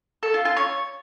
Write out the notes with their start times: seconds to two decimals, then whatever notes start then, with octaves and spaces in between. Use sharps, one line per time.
0.23 A4
0.34 F4
0.45 F4
0.57 C#5